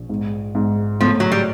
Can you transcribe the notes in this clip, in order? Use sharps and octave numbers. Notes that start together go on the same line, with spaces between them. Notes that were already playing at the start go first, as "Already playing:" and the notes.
Already playing: A#1
G#2
G#2
A2 F3
F#3
G3